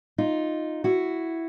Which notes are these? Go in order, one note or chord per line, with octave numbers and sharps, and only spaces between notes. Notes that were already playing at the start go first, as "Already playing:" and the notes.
D#4 F4
E4 F#4